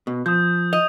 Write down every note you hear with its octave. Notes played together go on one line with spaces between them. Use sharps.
B2
F3 D#6 G6
D#5 F7